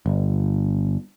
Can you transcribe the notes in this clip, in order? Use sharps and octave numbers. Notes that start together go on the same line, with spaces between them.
G1